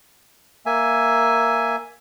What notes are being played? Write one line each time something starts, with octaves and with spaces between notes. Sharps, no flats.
A#3 E5 G#5